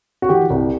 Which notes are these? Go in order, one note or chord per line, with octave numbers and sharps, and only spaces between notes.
F#4
E3 G4
C2